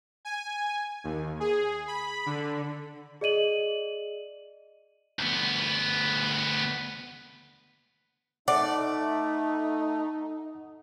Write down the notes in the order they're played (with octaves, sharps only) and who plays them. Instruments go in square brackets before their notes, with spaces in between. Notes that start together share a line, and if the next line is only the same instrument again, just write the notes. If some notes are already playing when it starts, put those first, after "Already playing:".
[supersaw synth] G#5
D#2
G#4
B5
D3
[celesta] G#4 D5 D#5 D#7 F#7
[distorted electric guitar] D2 B3
[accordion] A3 [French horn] D#4 [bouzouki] D5 [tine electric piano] F#5